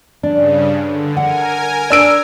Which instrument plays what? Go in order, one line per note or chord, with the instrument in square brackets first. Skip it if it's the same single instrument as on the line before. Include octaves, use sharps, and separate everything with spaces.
[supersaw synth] G2 C#3 [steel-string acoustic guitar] D4
[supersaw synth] D3
[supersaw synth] A#4 G#5 [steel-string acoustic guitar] F#5
[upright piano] D4 E6 D7